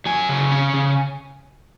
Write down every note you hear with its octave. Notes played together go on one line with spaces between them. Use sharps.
F#3 G#5
C#3
C#4
C#3